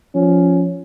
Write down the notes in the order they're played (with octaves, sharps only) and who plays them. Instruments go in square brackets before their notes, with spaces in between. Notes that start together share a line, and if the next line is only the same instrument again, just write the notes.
[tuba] F3 [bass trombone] C#4